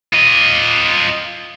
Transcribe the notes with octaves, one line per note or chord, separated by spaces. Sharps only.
F4 D#5